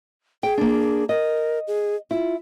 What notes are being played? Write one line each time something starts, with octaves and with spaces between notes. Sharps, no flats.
G#4 G5
A#3 D4
A#4 D#5
G#4
E4 F4